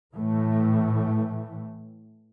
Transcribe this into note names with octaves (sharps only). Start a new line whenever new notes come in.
A2 E3 A3